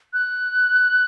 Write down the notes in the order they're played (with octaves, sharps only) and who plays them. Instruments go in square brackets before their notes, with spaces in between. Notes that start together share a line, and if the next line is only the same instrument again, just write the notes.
[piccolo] F#6